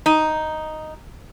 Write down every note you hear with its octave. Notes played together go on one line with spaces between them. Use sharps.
D#4